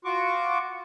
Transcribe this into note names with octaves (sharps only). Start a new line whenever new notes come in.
F4 F#4 C#6 D6